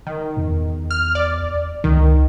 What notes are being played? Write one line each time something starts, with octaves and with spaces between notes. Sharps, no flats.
D#3
E2
F6
D5
C#2 D#3